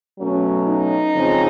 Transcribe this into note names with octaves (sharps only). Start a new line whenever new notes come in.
B2 F#3 A3 C#4
D#4
F2 C#3 F3 G#3 C4